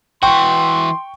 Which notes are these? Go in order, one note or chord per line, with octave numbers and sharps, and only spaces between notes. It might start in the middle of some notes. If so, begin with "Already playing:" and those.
E3 F#4 G5 C6 C#6